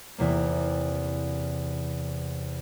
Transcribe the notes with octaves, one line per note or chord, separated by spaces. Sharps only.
E2 C3 A#3